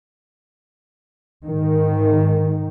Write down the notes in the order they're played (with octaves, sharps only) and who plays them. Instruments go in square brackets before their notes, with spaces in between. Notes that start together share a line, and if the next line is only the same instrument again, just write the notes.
[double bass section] G#2 D#3